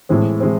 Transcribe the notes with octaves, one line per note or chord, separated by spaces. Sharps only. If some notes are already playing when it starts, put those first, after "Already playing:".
A2 E3 G#3 C4
E3 G#3 C4